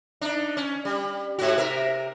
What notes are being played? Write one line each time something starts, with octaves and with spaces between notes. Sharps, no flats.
D4 D#4
C#4
G3
G#2 F#4
C3 A#4 E5